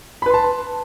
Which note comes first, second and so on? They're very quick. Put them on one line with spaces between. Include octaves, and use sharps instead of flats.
B5 B4 C6 A5